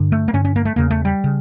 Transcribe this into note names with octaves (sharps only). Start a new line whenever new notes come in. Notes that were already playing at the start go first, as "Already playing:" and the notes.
Already playing: G2 D3
A3
A#3
G2 D3 C#4
C#4
A#3
A3
E2 C#3 A#3
A3
G3
C#3